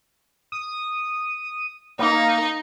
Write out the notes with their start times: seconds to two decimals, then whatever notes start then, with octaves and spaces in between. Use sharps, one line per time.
0.52 D#6
1.99 A#3 D#4